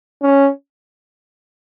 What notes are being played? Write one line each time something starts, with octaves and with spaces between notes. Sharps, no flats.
C#4